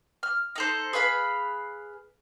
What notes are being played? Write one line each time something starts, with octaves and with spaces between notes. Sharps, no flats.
F6
D#4 A4 C5
G#4 B4 F5 B5